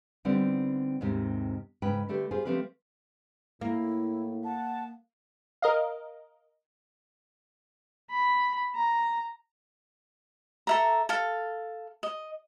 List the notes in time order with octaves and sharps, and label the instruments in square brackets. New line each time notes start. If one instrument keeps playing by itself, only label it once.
[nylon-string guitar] D3 G3 B3 C4 D#4
D#2 G#2 C3 D#3
G#2 C#3 B4 G5
D3 A3 G4 B4
F4 G4 G#4 C5
F3 F#3 A3 C4 G4 B4
[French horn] A2 [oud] A#3 [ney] E4
[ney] F#5 [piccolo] A5
[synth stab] A#4 D#5 F5
[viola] B5
A#5
[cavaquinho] A4 E5 A#5
A4 F5
D#5